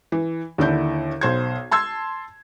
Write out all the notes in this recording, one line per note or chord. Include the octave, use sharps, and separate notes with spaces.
E3
D#2 D3 E4 G6
B1 C5 G#6
A5 C6 E6 G#6